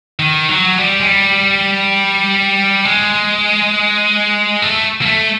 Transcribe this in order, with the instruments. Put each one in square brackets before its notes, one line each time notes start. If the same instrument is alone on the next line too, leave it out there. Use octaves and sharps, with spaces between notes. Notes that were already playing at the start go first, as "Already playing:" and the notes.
[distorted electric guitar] D#3
F#3
G3
G#3
G3
G#3
A3
A#3
A3